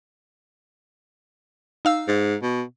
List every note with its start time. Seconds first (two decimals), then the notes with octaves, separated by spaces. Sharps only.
1.85 D#4 F5 E6
2.08 G#2
2.42 B2